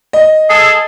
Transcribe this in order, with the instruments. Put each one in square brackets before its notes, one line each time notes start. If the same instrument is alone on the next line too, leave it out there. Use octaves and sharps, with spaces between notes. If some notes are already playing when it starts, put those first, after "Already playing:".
[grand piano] D#5
[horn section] G#4 A4